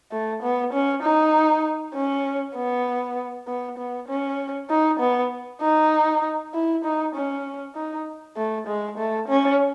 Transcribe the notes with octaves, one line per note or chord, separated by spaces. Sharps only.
A3
B3
C#4
D#4
C#4
B3
B3
B3
C#4
D#4
B3
D#4
E4
D#4
C#4
D#4
A3
G#3
A3
C#4